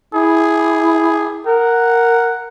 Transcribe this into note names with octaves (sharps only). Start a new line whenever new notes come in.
E4 G#4
A#4 F#5